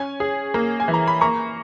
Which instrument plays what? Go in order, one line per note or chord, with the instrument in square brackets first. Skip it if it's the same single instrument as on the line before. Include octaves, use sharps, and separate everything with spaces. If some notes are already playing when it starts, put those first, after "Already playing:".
Already playing: [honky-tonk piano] C#4 [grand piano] G#5
[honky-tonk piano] G#4
A#3
[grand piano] G#5
[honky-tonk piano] E3
[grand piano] A#5
B5
[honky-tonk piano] A#3 [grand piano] A#5 C#6